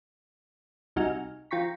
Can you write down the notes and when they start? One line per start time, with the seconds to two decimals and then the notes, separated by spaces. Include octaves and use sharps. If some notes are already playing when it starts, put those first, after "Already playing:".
0.96 C2 C3 D#4 F#4 G#5 F6
1.51 F3 F4 G5 A#5 C#6 B6